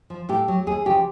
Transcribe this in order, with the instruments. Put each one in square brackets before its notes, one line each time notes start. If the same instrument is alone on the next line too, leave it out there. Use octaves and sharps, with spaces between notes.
[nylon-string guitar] F3
A2 G4
F#3
D#2 G#4
C#3 F3 G4